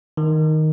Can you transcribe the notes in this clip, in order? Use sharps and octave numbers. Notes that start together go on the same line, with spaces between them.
D#3